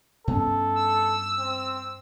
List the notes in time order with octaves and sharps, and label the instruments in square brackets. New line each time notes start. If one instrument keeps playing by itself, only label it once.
[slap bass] G2 B3 C#4 [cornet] A4
[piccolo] E6
[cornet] C4